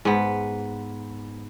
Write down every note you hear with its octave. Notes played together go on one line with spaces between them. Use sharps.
G#2 B3